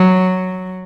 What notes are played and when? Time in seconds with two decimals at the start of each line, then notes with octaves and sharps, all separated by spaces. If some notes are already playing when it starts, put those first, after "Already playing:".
Already playing: F#3